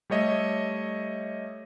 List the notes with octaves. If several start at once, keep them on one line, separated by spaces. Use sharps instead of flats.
G3 A3 C#5 D#5 E5